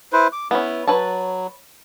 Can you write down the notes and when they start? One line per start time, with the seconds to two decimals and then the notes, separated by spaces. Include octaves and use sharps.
0.13 E4 B4 C5
0.32 D6
0.51 B3 C#4 E4
0.87 F#3 B4 C#5 A5